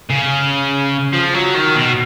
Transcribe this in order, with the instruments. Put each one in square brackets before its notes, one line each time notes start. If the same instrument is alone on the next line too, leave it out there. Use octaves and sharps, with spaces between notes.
[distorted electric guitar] C#3
F3
F#3
D#3
B2